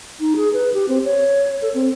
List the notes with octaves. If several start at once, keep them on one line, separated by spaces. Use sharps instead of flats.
D#4
G#4
B4
G4
C4
C#5
A4
C4